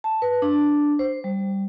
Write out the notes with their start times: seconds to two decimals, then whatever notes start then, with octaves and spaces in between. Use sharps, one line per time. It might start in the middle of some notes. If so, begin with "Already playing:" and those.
0.04 A5
0.22 B4
0.42 D4
0.99 C5
1.24 G3